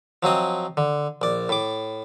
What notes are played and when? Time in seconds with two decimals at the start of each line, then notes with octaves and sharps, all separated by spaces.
0.23 F3 F#3 C4 D#5
0.77 D3
1.22 A#1 D5
1.49 A2 D6